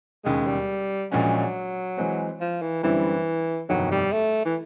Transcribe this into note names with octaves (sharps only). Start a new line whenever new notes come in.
E1 D#2 C#3 G#3
G3
A#1 A#2 F3 F#3 G#3 C#4
E3 G#3 C4
F3
E3
F#2 D3 E3 G3 C4 E4
G1 F2 C3 D#3 F#3
G3
A3
E3